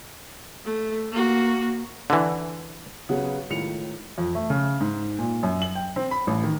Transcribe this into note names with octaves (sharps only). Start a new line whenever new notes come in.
A3
A#3 F#4
D3 E3
C#3 F#3 B3 F#4 G#4
C#2 A2 D#3 C#7 F7
F2
A3
C#3
G#2
A#2
F#2
F#7
G5
C4
B5
A1
D#3